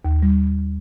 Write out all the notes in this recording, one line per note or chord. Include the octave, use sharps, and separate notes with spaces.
D#2
G3